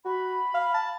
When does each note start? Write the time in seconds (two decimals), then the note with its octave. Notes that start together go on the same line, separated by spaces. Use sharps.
0.05 F#4 B5
0.55 F5
0.74 A5